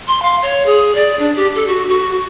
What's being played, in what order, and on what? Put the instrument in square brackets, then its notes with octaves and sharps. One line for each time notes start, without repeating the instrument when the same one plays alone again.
[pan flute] C6
F5
C#5
G#4
D5
D4
G4
A4
F#4
F#4